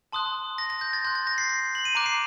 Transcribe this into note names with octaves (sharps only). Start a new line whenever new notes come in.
A5 C6 D#6 F#6
A#6
A#6
G6
A6
C6 F#6 G6
A6
A#6
C7
C7
F#7
D#7
A#5 D6 F#6 D7
C7